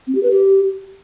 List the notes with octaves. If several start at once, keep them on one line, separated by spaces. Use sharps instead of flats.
C4
G4
B4
G4